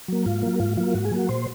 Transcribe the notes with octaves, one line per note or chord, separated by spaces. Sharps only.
F#3 A#3
G#2 F4
F#3 A#3
G#2 F4
F#3 A#3 F4
G#2 F#4
G#4
F#3 A#3 F#4
A#2 C5